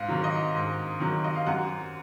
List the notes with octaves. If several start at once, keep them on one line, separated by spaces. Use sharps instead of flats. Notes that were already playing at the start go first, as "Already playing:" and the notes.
Already playing: G#2 F5
D#3 F#3
D#5
G#2
D#3 F#3
D#5
F5
F#2 F#5